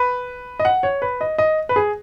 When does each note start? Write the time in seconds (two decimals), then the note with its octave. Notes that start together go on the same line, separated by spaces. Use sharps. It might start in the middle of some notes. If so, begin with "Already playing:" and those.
Already playing: B4
0.60 D#5
0.65 F#5
0.83 C#5
1.02 B4
1.21 D#5
1.38 D#5
1.69 B4
1.76 G#4